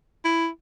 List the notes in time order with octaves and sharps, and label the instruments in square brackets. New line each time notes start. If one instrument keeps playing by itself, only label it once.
[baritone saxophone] E4